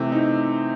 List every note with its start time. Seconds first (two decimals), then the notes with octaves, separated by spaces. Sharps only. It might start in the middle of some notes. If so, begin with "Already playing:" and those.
Already playing: C3 E3 A3
0.12 D#4